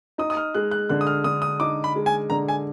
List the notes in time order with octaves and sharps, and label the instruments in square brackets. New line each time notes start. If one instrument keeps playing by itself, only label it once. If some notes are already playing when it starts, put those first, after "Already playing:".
[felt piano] D#4 [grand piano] D#6
[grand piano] D#6
F6
[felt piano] G#3 [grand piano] F#6
[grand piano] F#6
[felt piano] D3 [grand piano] F#6
[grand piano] D#6
F6
[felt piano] D3 [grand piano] D#6
[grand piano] D#6
[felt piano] D#4 [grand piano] D6
[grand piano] B5
[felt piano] G#3
[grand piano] G#5
[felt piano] D3 [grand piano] A#5
[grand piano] G#5